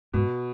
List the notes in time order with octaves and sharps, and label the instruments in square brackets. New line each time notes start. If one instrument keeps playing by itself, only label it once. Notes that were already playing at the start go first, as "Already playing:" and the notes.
[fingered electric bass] G#2 [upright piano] B2